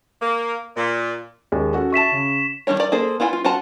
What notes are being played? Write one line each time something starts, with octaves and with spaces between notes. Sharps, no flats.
A#3
A#2
D#2 G#3
C#4 F#4 A4
E5 A5 C#6 B6 E7
C#3
D#3 G3 C#4 D4 C#5
D#3 D5 A#5
A#3 G#4 A4 C5
B3 E4 F4 G5 G#5
F4
F4 F#4 F#5 A5 A#5